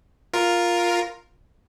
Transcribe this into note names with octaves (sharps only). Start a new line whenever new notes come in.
F4 A#4